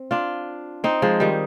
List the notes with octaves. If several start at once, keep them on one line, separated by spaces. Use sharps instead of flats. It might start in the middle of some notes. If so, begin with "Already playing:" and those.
Already playing: C4
D4 F4
C4 D#4
F3 G#3
D#3 G3